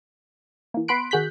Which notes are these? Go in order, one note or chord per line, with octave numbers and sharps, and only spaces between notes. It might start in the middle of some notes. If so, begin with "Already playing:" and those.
E3 A#3
B3 B5 C6 F#6 D7
D#3 F#4 G#4 F#6 G6 B6